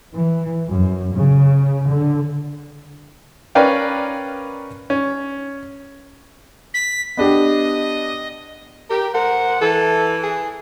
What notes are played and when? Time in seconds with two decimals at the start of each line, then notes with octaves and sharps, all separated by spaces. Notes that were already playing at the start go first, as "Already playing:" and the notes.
0.18 E3
0.69 F#2
1.14 C#3
1.88 D3
3.55 C#4 A#4 B4 D5 F5 G5
4.90 C#4
6.74 B6
7.17 B3 D4 G4 D#5
8.90 G4 A#4
9.14 G#2 A#4 C5 F#5
9.61 E3 A4
10.23 G#4